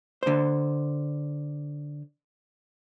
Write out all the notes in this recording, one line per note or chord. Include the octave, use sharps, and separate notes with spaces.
D3 C5